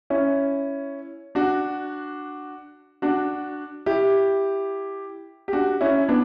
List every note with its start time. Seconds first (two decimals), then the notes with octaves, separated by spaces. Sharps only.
0.10 C#4 E4
1.35 D4 F#4
3.02 D4 F#4
3.86 E4 G4
5.48 G4
5.53 D4 F#4
5.81 C#4 E4
6.09 B3 D4